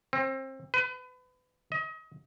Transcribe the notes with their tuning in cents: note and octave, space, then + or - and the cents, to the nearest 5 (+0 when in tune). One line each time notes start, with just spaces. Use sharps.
C4 +30
B4 +30
D#5 +35